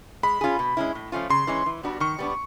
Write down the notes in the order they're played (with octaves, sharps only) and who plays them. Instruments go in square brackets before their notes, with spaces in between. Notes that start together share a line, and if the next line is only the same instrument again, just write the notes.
[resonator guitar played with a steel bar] G#3 [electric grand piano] B5
[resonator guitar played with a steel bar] C#4 F4 G#4
B2
G#3 C#4 E4
A2
F3 A3 C#4 F4
[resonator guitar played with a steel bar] C#3 [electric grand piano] C6
[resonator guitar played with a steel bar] E3 G#3 C#4
E3
G3 B3 D4 F#4
[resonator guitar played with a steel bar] D#3 [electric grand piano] C#6
[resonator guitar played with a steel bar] G3 B3 D4